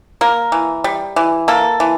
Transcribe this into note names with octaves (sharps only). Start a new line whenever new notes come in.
A#3 A#4
E3
G3
E3
A#3 A4
E3